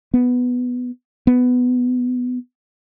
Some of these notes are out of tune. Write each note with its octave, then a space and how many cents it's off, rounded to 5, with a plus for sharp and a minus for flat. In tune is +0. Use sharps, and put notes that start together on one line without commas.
B3 +5
B3 +10